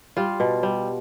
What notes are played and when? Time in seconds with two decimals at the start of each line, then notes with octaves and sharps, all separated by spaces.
0.17 G3 F4
0.40 B2
0.63 G3